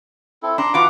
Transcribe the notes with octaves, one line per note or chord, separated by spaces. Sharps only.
C4 E4 A4
D4 A#5 C6
E2 F4 F#4 B4 F#5 D6